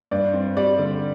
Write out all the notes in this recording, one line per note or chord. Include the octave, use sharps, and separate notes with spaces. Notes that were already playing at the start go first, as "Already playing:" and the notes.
G2 D5
C4
G3 D5
D3